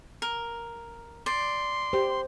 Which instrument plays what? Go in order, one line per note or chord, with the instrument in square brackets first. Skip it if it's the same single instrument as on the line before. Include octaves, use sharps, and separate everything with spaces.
[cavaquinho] A#4
[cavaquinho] D5 [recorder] C6
[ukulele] G4 [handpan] C5